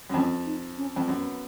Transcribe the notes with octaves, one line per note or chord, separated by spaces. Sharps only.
F#2
F2 C#4
D#4
C#4
F2
F#2 B3